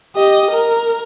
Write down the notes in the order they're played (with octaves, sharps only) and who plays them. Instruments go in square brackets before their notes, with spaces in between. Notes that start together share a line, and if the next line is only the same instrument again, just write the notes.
[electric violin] G4 D#5
A#4